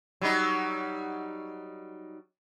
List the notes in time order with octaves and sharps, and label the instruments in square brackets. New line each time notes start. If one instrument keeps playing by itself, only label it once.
[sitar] F#3 G3 D#4